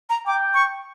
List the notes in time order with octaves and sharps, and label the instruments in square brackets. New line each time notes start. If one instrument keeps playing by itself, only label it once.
[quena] A#5
[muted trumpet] G5 [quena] D6
[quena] C#6